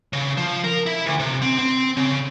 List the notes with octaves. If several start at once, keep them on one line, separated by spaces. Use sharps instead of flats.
C#3
F3
A#4
E4
D2
C3
C4
C4
C#3